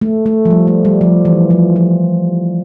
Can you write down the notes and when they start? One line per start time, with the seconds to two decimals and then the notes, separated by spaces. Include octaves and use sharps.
0.01 A3
0.26 A3
0.45 F3
0.50 G3
0.67 A3
0.85 G3
1.01 F3
1.25 E3
1.50 F3
1.76 F3